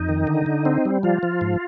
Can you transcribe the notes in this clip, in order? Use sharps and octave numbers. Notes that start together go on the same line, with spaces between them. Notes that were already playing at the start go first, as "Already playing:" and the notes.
Already playing: F2 D#4
D#3
D3
D3
C4
G3
F3 F4
F3
G#2